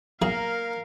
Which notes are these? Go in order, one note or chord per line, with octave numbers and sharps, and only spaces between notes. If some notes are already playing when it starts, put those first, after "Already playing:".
B1 F#3 A#3 G#4 A#4 F5